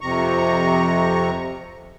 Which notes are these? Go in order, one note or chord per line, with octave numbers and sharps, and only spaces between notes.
F2 C3 A#5 C#6